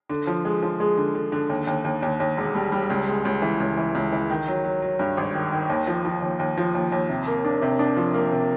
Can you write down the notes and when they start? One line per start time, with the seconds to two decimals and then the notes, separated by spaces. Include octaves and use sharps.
0.09 D3
0.27 F3
0.45 G#3
0.62 F3
0.80 G#3
0.97 D3
1.15 D3
1.32 D3
1.50 D#2
1.67 D#2
1.85 D#2
2.02 D#2
2.20 D#2
2.37 E1
2.55 G3
2.72 G3
2.90 C#2
3.07 G#3
3.25 C#2
3.42 E3
3.60 C#2
3.77 E3
3.95 C#2
4.12 E3
4.30 D#3
4.48 F#3
4.65 F#3
4.82 F#3
4.99 G2
5.17 G#1
5.35 D#3
5.52 D#3
5.70 D#2
5.87 F3
6.05 F3
6.22 D#2
6.39 D#2
6.58 F3
6.75 D#2
6.92 D#2
7.10 C3
7.27 A#3
7.44 D4
7.62 C3
7.79 D4
7.97 F3
8.14 A#3
8.32 C3